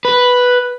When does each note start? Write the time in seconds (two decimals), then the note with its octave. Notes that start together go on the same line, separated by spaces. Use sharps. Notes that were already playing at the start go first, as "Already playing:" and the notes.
0.05 B4